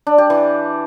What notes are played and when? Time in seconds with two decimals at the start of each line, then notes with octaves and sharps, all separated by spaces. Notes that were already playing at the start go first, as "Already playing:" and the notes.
0.07 D4
0.18 G4
0.30 E3